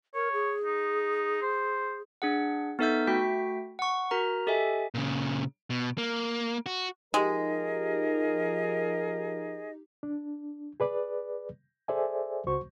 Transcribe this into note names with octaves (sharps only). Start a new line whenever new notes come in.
A#4 C#5
G#4
D#4
C5
D4 G#4 F#5
B3 D#4 A4 E5 E6 G6
A3 F#4 G5 B6
F#5 C#6
F#4 A#4 A#5
G4 A4 D#5 E5 G#5
A#2 C#3
B2
A#3
F#4
F3 G#3 D#4 G4 G#4 A#4 D#5
D4
G#4 B4 D5
G#4 A4 C5 D5 E5 G#5
C#2 F#4 C5 C#6